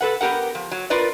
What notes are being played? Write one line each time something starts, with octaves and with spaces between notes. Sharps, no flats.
A4 B4 F#5
B3 C4 G4 A#4 F#5
F3
F#3
F4 A#4 B4 D5